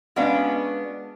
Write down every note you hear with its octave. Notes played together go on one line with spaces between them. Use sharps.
G#3 B3 C#4 D4 F#4 F5